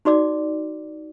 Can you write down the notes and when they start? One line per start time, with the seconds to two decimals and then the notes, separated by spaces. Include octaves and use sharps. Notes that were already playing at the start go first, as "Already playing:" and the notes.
0.05 D#4 F#4 D5 D6